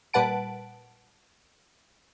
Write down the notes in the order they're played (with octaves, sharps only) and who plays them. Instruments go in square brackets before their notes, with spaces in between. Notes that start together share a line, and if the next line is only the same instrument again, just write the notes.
[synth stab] A#2 G3 B4 F#5 A5 D7